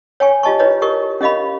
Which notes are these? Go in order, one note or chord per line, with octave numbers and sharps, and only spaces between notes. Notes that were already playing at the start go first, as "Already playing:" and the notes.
C#5 G5 G#5 C#6
F4 G4 D#5 A5 C#6
E4 B4 C#5 D#5
G4 A#4 D#5 C#6
C#4 G4 D#5 F5 B5